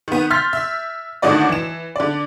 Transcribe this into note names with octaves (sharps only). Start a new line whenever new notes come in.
D#3 B3
C6 F6 G6 A6 B6
E5
A2 D3 D#3 F#4 D5 D#5
E3 E7
D3 D5